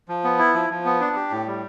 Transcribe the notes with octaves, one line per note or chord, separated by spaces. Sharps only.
F3
B3
E4
F3
F3
B3
D4
G4
A2
G3